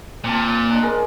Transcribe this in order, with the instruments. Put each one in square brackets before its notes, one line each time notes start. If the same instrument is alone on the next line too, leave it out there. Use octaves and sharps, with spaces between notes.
[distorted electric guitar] A#2 [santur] C4 A5
[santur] D4 D#5
G#4 A#4